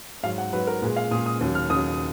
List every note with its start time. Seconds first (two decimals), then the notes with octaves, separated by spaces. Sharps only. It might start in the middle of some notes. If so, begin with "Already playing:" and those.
0.23 G#2 F#3 F5
0.38 F#5
0.53 G#2 F#3 B4
0.67 A#4
0.82 A#2 G#3 B4
0.96 F5
1.11 A#2 D#6
1.16 G#3
1.26 D#6
1.41 D#2 C#3 F#3
1.55 F6
1.70 D#2 C#3 F#3 D#6